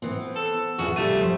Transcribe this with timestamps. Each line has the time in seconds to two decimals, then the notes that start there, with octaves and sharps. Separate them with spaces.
0.02 E3 B3 C4
0.36 A4
0.78 E2 F4 F#4 G#4
0.96 C3 G3 A3 D#7
1.19 F2 C5